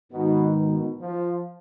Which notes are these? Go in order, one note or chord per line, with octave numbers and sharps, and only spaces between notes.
G#2 B2 D#3 G#3 D#4
B2
F3